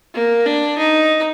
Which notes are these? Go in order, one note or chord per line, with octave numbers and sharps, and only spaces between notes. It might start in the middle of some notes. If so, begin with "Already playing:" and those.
A#3
D4
D#4